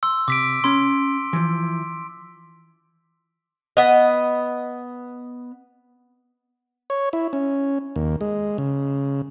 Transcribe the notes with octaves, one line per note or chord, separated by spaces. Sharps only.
C6 E6
C3 D6 B6 D7
C#4 B5 C6
E3 F3
B3 D#5
C#5
E4
C#4
D#2
G#3
C#3